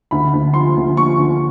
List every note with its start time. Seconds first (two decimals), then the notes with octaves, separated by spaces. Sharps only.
0.11 D2 B5
0.33 D2
0.54 F3 C6
0.76 D2
0.97 F3 C#6
1.18 D2